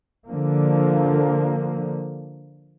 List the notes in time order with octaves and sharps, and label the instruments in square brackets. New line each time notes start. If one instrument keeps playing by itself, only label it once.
[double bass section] D3 F3 A#3